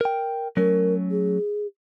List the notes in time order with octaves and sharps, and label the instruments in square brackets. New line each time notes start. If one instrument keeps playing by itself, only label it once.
[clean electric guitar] A#4 G5
[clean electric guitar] F#3 A3 C#4 [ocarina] A#4
[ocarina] G#4